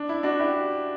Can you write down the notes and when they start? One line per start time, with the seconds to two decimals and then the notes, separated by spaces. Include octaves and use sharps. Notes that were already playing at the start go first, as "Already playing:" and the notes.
Already playing: D4
0.09 E4
0.23 D4 F#4
0.39 E4 G4